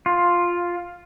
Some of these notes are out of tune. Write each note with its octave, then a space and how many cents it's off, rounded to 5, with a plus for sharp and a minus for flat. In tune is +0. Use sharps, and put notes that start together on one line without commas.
F4 +5